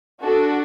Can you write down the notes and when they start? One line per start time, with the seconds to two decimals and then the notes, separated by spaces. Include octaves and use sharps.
0.22 D4 F#4 A4